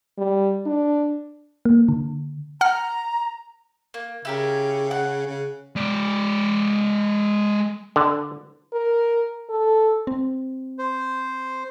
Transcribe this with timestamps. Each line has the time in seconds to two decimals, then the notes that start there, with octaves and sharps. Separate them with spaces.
0.18 G3
0.66 D4
1.65 A#3
1.88 D3
2.61 F#5 A#5 F6
3.94 A#3
4.25 C#3 E4 G4 A#4
4.91 F#5
5.27 C#3
5.76 G#3 D5
7.96 D3
8.73 A#4
9.50 A4
10.07 C4
10.79 C5